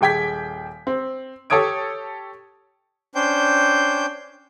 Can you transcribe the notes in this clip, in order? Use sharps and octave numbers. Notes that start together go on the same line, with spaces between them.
D#1 G#4 G5 G#6 B6
C4
G4 A4 C#5 D#6 G#6 D7
C#4 D4 C5 G5 G6